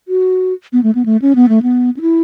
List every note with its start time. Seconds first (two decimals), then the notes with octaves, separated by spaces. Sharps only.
0.08 F#4
0.73 B3
0.83 A3
0.95 B3
1.06 A3
1.22 C#4
1.35 B3
1.49 A3
1.63 B3
1.97 C#4
2.01 E4